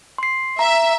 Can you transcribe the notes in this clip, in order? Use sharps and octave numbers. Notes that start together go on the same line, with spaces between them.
C6 C7
E5 A#5